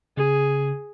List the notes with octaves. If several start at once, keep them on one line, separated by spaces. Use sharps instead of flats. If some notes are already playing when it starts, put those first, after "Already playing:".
C#3 G#4